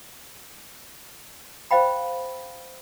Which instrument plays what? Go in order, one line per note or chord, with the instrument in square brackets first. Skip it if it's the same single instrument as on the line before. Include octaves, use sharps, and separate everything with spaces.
[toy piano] C5 D#5 F5 G5 B5